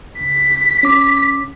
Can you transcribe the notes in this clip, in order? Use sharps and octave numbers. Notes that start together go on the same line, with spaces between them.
C#2 B6
C#4 D6